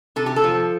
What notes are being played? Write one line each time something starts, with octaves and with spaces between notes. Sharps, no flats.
C3 A4
G4
A4
F3